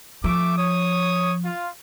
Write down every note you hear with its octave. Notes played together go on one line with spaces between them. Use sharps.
F3 A3 E5 D6
C#5 D#6
F4